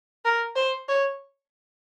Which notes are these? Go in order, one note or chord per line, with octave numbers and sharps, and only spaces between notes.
A#4
C5
C#5